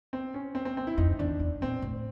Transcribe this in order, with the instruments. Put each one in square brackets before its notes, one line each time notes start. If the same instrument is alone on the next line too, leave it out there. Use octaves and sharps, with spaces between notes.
[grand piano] C4
C#4
C4
C4
C4
E4
[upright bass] F2 [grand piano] D#4
[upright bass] E2 [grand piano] D4
[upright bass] E2
[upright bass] A#2 [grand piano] C4
[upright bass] A2